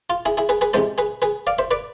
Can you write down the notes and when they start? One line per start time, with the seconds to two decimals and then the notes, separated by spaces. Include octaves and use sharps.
0.10 F4
0.26 E4 G#4
0.37 E4 G#4
0.49 G#4 B4
0.61 G#4 B4
0.74 C3 E3 G#3 A4 C5
0.98 G#4 B4
1.22 G#4 B4
1.47 D5 F5
1.58 C5 E5
1.71 B4 D5